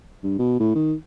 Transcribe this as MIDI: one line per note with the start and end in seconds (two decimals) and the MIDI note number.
0.23 0.37 43
0.39 0.58 47
0.60 0.71 45
0.75 0.94 51